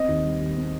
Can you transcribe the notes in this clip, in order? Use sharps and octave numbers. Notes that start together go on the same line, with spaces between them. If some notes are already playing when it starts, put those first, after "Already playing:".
Already playing: C4 D#5
D#2
G3
D#3
C4